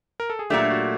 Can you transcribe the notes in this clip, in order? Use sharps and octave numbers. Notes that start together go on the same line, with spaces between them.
A#4
A4
G#4
A#2 F#3 A3 D4 G4
F#4